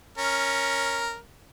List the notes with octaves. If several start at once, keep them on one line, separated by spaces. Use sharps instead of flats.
C#4 A#4